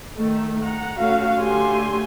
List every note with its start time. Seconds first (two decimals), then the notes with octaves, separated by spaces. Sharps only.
0.16 D#3 A3
0.62 F#5 A#5
1.00 A3 C#4 F#4 F5
1.39 D3 A3 G4 G#5 C6